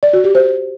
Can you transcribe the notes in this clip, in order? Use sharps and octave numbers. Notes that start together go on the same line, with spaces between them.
D5
F#4
G4
C5